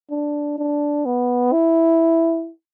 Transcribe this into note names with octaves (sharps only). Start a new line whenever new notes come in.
D4
D4
B3
E4